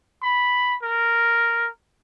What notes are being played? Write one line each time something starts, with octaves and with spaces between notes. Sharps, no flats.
B5
A#4